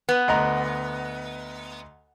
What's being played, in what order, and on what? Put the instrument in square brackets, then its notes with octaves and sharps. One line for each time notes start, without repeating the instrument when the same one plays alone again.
[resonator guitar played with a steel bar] B3
[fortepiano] D2 D#5 A#5